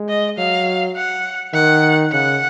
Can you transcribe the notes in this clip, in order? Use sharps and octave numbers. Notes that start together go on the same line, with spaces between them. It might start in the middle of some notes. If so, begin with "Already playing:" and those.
Already playing: G#3
D#5
F#3 F5
F#5
D#3 F#5
C#3 F#5